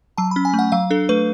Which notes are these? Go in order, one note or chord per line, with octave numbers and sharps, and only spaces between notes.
F#3 A5
B5
C#4
G#5
A3
F#5
F#3 F5
D4 A4
A3 B4